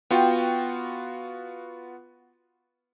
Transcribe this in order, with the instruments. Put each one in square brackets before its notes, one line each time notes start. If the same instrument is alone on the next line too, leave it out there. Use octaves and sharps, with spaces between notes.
[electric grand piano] B3 F4 F#4 [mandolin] G5